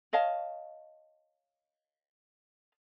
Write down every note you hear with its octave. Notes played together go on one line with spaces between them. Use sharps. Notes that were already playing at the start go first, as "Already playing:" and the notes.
C#5 D#5 F5 A5